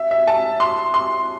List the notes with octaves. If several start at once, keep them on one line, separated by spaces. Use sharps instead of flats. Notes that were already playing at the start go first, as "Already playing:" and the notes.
Already playing: E5
E5
A5
C6
C6